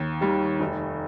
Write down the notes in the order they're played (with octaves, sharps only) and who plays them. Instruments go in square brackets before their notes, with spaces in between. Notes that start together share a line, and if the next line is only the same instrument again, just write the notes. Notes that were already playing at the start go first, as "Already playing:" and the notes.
Already playing: [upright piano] D#2
D#3 G3
F1